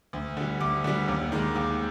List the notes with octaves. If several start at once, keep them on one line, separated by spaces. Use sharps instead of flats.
D2
D3 G3
D2 D6
D3 G3
D#2
D#3 G#3
D#2 D6